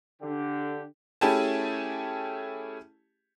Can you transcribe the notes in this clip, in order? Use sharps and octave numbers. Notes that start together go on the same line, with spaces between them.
D3 G4
A3 C#4 E4 G4 G#4 A5